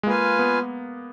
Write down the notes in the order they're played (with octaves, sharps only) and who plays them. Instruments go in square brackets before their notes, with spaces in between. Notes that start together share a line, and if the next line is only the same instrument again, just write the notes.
[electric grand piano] G#3
[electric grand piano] A#3 [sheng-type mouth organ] F4 B4 F5 G#5
[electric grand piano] B3